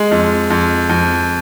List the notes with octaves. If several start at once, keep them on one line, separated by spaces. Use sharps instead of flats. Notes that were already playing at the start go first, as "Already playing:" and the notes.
Already playing: G#3
F2
F2
F2